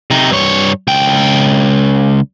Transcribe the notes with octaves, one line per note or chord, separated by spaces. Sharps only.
C3 D#4
G2 C#5
C#2 G5